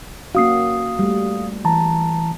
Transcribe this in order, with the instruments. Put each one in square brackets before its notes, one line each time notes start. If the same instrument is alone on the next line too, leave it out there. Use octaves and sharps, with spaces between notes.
[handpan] A#3 C#4 F#4 [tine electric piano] F5 D#6 C7
[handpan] G3 A3
[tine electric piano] E3 A5 A#5